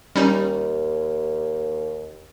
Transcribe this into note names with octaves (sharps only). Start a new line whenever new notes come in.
D#2 G3 C#4 D#4